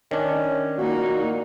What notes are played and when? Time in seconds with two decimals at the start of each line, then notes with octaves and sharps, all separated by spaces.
0.11 D#3 C#4 D4
0.78 A#2 A#3 D#4 F#4